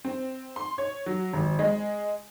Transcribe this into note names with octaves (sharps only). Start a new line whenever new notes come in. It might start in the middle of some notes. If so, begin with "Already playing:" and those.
C4
C6
C#5
F#3
G#1
G#3